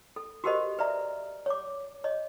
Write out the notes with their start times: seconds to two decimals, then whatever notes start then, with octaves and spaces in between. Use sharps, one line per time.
0.16 A4
0.44 F#4 G4 A4 A#4 C5 D#5
0.79 B4 D5 E5 A#5
1.46 C#5 D6
2.04 C#5 D#5